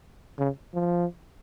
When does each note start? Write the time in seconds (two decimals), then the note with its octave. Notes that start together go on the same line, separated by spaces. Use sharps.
0.39 C#3
0.74 F3